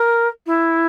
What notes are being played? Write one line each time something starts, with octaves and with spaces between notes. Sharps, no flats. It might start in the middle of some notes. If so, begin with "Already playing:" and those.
Already playing: A#4
E4